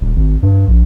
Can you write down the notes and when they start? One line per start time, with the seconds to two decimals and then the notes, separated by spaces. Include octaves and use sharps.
0.01 D#1
0.16 G#1
0.43 G2
0.68 A#1